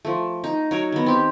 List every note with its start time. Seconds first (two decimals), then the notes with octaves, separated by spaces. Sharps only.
0.05 F3 A3
0.44 D#4
0.71 F#3 A#4 C#5
0.92 D#3 B3
1.06 C4 G4